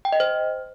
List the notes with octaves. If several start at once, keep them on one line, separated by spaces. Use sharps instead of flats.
G5
D#5
C5